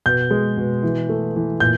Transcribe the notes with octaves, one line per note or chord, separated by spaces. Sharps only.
B2 G6
G#3
B2
E3
A3
E3
A#2 G6